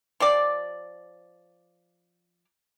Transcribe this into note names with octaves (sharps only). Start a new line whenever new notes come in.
F3 G4 D5